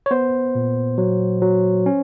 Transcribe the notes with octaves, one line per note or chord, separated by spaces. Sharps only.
C#5
B3 C5
A#2
F#3
F#3
C#4